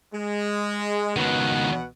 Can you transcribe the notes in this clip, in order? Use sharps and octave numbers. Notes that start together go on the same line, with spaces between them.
G#3
C#2 B2 D#3 B3 F#5